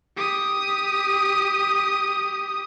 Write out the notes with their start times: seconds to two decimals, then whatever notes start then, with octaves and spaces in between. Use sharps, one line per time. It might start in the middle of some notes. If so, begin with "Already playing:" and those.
0.17 G4 D#6